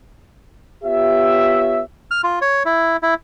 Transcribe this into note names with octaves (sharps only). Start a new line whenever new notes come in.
B3 F4 G4 C#5 E5
F6
F4
C#5
E4
E4